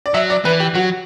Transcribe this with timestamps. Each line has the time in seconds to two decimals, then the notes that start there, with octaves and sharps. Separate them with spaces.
0.06 D5
0.14 F#3 E5
0.30 D5
0.45 E3 B4
0.60 G4
0.75 F#3 F#4